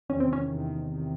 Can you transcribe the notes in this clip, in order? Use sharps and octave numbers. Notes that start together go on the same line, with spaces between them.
E2 C3 D#3 C#4
C4
C#4
E2 C3 D#3
C3 D#3